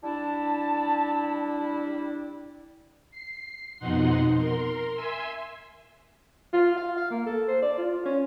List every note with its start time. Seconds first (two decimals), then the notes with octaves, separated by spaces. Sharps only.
0.03 G3 D4 E4 A5
3.11 C7
3.79 F2 B2 D#4 F#5 C6
4.38 A#4 C6
4.94 E5 G#5 C6 E6
6.53 F4
6.77 F5
6.97 F5
7.11 A#3
7.26 A4
7.48 C5
7.62 D5
7.78 F4
8.06 C#4